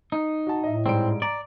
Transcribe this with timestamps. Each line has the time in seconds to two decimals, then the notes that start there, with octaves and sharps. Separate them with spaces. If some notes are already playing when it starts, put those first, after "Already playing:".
0.12 D#4
0.47 F#4 A5
0.64 A2 D#5 E5
0.86 G#2 G3 C4 D7
1.22 D5 A#5